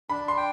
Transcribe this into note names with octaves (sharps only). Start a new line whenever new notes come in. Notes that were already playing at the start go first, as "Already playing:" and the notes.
D4 B5
C6
G5